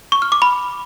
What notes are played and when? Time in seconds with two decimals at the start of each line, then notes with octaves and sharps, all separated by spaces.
0.12 C#6
0.22 F6
0.32 D6
0.42 B5